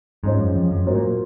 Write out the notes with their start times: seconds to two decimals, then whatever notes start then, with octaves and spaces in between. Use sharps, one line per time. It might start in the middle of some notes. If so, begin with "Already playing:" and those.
0.24 G#2 G#3 C#4 F4 C5
0.39 F#2
0.55 F2
0.71 F#2
0.86 G#2 F#3 A#3 F4 C5
0.95 A#2